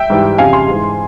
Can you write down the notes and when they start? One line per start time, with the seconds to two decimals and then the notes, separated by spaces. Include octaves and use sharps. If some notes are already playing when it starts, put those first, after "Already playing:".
Already playing: E5 G5
0.10 G#2 E3 G3
0.38 F2 C#3 G3 F5 G#5
0.53 G#5 C6
0.67 G#2 E3 G#3